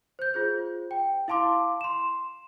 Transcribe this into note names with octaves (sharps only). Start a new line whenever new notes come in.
C5 G6
F4 G#4 C5
G5
E4 F5 A5 C6 D6
C6 E7